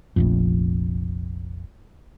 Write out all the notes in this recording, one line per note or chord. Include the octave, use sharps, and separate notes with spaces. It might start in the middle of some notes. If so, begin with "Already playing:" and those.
F1 A#1 F2